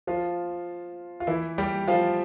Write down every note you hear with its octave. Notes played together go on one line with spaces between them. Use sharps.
F3 F4
F4
E3 E4
G3 G4
F3 F4